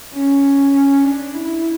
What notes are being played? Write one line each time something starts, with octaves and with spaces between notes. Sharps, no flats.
C#4
D4
E4